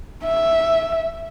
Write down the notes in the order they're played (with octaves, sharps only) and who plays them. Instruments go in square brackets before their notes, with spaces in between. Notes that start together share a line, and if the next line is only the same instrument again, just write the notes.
[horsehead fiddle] E5